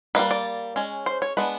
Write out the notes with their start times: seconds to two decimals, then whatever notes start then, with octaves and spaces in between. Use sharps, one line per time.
0.15 G3 A#3 D#4 B4
0.31 D5
0.76 G#3 C#4
1.06 C5
1.22 C#5
1.37 G#3 B3 D4 B4